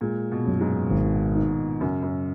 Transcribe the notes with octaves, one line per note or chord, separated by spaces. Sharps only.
A#2 G#3
B2
F#2
G#2
G#1
D#3
F#2 C#3
F#2